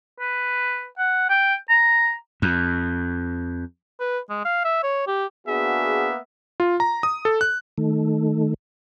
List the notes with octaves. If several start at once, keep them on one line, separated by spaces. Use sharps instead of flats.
B4
F#5
G5
A#5
F2
B4
G#3
F5
E5
C#5
G4
A#3 B3 D4 F#4 G#4 E5
F4
A#5
D#6
A4
F#6
D#3 A3